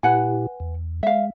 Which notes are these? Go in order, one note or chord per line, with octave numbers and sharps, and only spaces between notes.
A#2 E4 G4 B4 F#5 G#5
E2
G#3 E5 F5